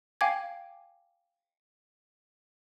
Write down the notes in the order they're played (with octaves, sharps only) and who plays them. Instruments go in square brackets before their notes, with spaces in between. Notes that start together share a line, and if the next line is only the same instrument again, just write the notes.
[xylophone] F5 G5 G#5 D6 G#6